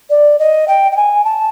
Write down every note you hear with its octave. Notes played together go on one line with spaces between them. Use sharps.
D5
D#5
G5
G5
G#5
A5